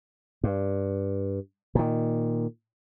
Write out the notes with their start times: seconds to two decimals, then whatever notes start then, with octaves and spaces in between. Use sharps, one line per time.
0.44 G2
1.75 A#2 D#3